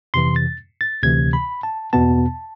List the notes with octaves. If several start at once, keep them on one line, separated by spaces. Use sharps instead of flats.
F2 C3 E3 C6
A6
A6
D2 C3 E3 G#6
B5
A5
E2 B2 B3 A5